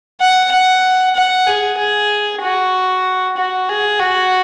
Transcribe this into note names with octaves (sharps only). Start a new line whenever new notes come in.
F#5
F#5
F#5
G#4
G#4
F#4
F#4
G#4
F#4